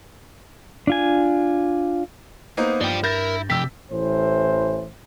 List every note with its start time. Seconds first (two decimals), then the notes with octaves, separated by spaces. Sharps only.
0.87 D4 F4 G#5
2.57 A#3 B3 D#4 C5
2.81 G2 F3 D5 G5
3.04 E4 A#4 G6 A6 A#6
3.50 C3 F3 G4 E6 B6
3.92 A1 A2 E3 C5